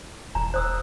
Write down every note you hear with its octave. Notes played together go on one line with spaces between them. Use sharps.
E1 A#5
C5 D#6 E6